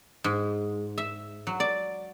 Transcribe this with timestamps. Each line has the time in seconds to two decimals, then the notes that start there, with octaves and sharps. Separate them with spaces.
0.24 G#2
0.98 E5
1.47 F#3
1.60 D5